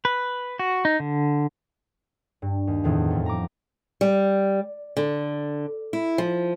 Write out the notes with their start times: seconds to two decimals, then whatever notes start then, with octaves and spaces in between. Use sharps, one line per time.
0.05 B4
0.59 F#4
0.85 D#4
1.00 D3
2.42 G2
2.67 D#2
2.84 E2 A2 D#3 B3 C4
3.10 F2
3.26 A#5 D6
4.01 G3
4.97 D3
5.93 E4
6.18 F3